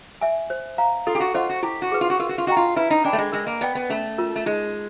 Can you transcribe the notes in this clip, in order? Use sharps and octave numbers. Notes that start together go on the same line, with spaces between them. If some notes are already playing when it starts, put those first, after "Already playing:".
E5 G#5
C5
F5 A#5
F4 A4
G4
F#4
F4 C5 D#5 F#5
F#4
E4 G4
F#4
G#4 B4
F4
F#4
F4 A#4
F#4
F4
F#4 D#5 G5 A#5
F4
E4 B4
D#4
D4 D5 G5 B5
A3
G#3
G#3 A#4
A#3
B3 D5 G5
B3
A3 C#4
F4 A#4
A3
G#3 D#4